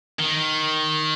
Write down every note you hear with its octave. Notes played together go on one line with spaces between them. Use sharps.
D#3